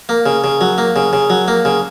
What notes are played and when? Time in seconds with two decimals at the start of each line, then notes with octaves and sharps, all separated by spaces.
0.09 A#3
0.26 C#3
0.44 C#3
0.61 F#3
0.78 A#3
0.96 C#3
1.13 C#3
1.30 F#3
1.48 A#3
1.65 C#3